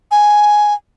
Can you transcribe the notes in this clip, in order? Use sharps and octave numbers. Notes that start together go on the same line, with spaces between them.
G#5